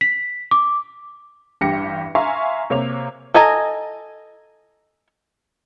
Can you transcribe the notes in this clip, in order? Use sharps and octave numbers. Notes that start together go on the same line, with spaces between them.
B6
D6
A1 G2 G4 A#6 C#7
E5 F5 G#5 A#5 C6 C#6
C3 A#3 C#5 F7
A4 D#5 G#5 A#5